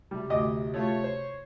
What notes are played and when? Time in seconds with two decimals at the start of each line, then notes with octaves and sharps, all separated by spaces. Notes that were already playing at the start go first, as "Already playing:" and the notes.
0.11 C3 G3
0.30 D2 D#5 D6
0.74 A3 F4 C#5
1.04 C5